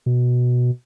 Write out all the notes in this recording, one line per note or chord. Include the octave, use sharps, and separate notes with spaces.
B2